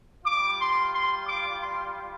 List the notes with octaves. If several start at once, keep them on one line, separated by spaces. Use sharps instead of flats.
G3 F4 D6
C6
C6
D6
C6